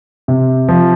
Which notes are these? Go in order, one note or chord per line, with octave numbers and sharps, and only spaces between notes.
C3
F3